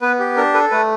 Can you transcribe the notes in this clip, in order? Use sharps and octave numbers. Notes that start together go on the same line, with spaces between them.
B3 B4
G4
D4 A#4
A4 B4
A3 B4